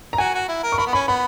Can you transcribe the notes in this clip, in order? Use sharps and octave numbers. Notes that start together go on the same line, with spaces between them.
A#5
F#4 G#5
F#4
E4
A#4
C#6
A#4 B5
B3
C#4 B5
B3 B5